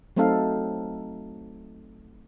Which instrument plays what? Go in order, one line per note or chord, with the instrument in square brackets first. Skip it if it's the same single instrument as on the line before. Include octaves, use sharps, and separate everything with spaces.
[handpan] F#3 A3 C4 D#4 A4 F5